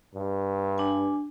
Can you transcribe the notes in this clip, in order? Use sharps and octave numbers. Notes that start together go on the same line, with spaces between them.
G2
D4 G#5